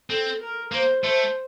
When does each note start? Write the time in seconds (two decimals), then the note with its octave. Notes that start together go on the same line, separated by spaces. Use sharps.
0.10 C4 A4
0.40 A#4
0.72 A#3 C5
1.03 A3 C5